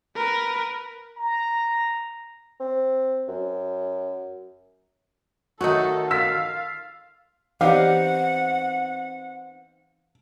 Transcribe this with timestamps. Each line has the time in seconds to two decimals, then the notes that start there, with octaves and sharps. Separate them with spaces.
0.16 A#4 B4
1.17 A#5
2.60 C4
3.28 F#2
5.61 D#3 F#3 A3 D#4 F#4 A4
6.11 F4 F5 E6 B6
7.61 E3 B3 C4 D#4 G4 D5 F5 F#5